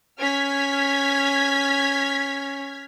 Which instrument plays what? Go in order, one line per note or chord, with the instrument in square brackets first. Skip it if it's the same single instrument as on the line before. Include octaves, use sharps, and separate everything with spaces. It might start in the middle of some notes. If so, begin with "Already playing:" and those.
[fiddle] C#4 [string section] F6 G#6 B6